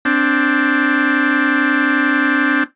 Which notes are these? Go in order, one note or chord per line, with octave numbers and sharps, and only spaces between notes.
C4 D4